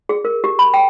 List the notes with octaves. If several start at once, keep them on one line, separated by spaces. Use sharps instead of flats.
G#4
A#4
G4
B5
G5